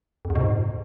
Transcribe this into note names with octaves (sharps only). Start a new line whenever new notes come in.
F2
E2
B2
G#2